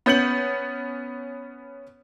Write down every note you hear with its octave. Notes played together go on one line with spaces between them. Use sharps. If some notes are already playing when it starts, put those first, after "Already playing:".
B3 C#4 G6 C#7 F#7